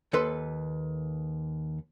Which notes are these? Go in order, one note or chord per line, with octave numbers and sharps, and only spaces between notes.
D#2 A4 B4 C6